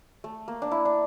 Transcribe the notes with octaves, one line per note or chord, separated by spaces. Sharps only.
A3
A#3
D4
E4
D4